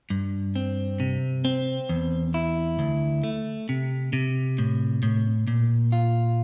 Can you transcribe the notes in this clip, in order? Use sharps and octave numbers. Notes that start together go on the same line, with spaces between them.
G2
C4
C3
C4
E2
E4
D2
A3
C3
C3
A2
A2
A#2
F4